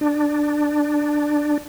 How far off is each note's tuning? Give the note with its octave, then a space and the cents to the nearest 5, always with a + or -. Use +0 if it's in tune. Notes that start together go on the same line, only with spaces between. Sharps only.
D4 +10